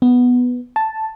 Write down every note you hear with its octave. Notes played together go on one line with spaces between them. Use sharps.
B3
A5